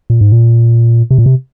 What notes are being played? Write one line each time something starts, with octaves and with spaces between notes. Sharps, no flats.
A#2
G#2
A#2
C3
A#2
C3